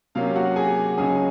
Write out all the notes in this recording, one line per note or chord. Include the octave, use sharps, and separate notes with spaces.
C3 F#3 A#3 C#4 F5
F#4 F#5
G#4 G#5
C#2 C#3 F#3 C#4 G#4 G#5